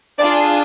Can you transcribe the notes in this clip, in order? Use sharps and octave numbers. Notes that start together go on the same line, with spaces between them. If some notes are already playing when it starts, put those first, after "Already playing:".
D4 F4 G#4 D5